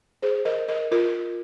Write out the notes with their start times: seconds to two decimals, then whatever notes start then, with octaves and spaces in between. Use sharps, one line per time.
0.22 G#4 C5
0.45 A#4 D#5
0.68 A#4 D#5
0.92 F4 A#4